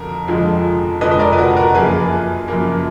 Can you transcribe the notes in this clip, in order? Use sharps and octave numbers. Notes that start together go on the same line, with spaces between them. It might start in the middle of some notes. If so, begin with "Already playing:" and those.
Already playing: F2 D3 F3 A#4
F2 D3 F3 G#3
F2 D3 F3 G#3 B4 D#5
D#5
A#4 D5
B4
F#4 A#4
F#4 A#4
F#2 F3 A#3 G#4 B4
F#2 F3 A#3